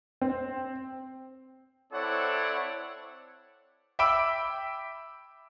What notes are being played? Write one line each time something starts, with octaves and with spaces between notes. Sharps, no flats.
C4
C4 E4 A4 C#5 D5 F#5
E5 G5 B5 D6 E6 D7